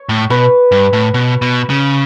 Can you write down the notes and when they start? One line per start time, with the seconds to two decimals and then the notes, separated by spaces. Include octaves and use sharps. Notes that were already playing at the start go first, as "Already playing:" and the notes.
Already playing: C#5
0.09 A2
0.30 B2 B4
0.72 G2
0.93 A2
1.14 B2
1.42 B2
1.70 C#3